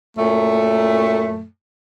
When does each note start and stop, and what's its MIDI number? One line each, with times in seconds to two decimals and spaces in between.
0.17 1.45 42
0.17 1.45 46
0.17 1.45 57